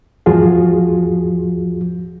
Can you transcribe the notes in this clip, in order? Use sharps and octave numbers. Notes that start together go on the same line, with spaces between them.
E2 G#2 F3 F4 F#4 G#4